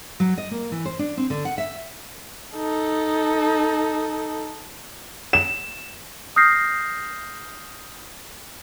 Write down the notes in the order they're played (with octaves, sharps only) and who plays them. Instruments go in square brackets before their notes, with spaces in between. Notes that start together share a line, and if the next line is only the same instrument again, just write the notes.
[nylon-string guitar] F#3
D#5
A#3
E3
C5
D4
C4
D3
F#5
E5
[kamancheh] D#4 A4
[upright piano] E7
[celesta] D#6 F6 G6 A#6 C7